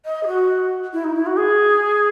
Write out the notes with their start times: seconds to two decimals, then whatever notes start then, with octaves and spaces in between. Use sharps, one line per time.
0.06 D#5
0.23 G#4
0.27 F#4
0.93 E4
1.04 D#4
1.15 E4
1.26 F#4
1.37 G#4